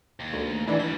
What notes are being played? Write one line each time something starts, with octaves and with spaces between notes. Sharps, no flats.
D#2
D2
G#2 E3 D4
F#3 G3 B6